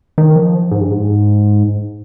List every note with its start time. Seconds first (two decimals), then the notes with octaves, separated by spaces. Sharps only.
0.18 D#3
0.36 F3
0.71 G#2
0.81 G2
0.91 G#2